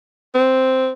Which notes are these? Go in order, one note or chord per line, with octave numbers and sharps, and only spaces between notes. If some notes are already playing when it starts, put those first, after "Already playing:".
C4